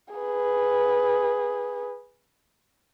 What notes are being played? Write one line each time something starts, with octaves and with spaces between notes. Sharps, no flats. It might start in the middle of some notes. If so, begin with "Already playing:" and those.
G#4 B4